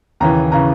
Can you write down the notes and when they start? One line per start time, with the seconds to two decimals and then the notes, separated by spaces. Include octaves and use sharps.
0.20 D#2 C#3 E3 A#5
0.52 C#3 E3 A#5